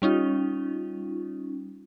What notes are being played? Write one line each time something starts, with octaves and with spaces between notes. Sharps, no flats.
G3 C#4 D#4 F4